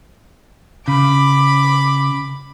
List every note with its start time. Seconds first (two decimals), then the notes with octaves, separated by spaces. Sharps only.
0.88 C#3 B5 D6